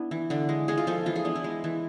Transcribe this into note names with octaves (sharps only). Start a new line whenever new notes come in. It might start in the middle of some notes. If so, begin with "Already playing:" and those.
Already playing: B3 D4 E4
E3
D3 D4
G#3
G#3 G#4
F4
F3 A4
E3 F4
G#4
B3 D4
E4
G#3
E3